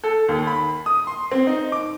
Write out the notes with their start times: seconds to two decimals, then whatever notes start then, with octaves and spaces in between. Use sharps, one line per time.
0.04 A4
0.28 D#2
0.47 B5
0.86 D#6
1.07 C6
1.31 C4
1.47 D#4
1.72 D6